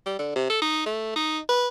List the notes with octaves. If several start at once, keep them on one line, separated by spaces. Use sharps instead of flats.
G3
D3
C3
A4
D#4
A3
D#4
B4